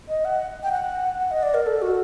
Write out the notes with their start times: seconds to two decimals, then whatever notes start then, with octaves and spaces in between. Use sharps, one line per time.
0.08 D#5
0.25 F#5
0.63 G5
0.72 F#5
1.19 F#5
1.31 D#5
1.43 D5
1.54 A#4
1.66 A4
1.82 F#4